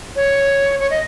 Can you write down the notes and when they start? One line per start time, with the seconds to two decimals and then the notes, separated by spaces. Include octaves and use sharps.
0.16 C#5
0.80 C#5
0.90 D#5